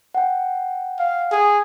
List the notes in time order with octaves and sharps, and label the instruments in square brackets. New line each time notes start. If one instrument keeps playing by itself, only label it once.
[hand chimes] F#5 G5
[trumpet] F5
G#4